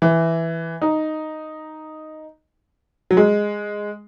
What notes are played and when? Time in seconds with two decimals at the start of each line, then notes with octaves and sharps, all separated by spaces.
0.02 E3
0.82 D#4
3.11 F#3
3.17 G#3